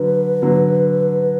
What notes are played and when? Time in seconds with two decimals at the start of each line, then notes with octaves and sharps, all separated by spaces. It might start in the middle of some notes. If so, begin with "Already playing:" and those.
Already playing: D3 F#3 B4
0.42 D3 F#3